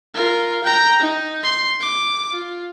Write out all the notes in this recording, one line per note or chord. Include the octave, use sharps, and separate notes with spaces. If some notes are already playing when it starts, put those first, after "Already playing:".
F4 A#4
G5 A#5
D#4
C6
D6
F4